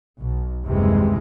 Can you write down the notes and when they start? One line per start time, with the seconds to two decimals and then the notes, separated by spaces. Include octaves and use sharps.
0.20 B1
0.65 F#1 D#2 C3 E3 G3 G#3